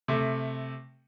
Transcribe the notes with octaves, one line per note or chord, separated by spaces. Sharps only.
C3 A3